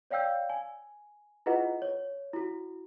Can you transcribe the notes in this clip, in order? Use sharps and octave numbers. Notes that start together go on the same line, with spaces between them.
C#5 D5 F5 G5 E6 G6
G#5
E4 F4 G#4 B4 D#5 F#5
C#5
E4 F#4